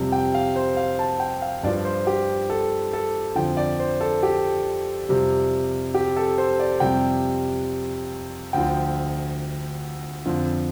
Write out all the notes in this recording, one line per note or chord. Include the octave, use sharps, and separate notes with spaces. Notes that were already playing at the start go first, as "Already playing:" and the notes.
Already playing: F2 C3 G3
G5
F5
C5
F5
A5
G5
F5
G2 F3 D5
C5
G4
A4
A4
F2 D3 F3 G5
D5
C5
A4
G4
F2 C3 G3
G4
A4
C5
D5
F2 C3 G3 G5
D2 D3 F3 G5
F2 D3 F3